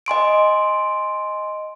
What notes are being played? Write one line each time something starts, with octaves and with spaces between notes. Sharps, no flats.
D#5 G#5 C6 D7